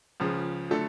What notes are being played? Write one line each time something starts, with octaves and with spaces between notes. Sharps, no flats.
C#2 C#3 F3
D3 F#3 A3 A4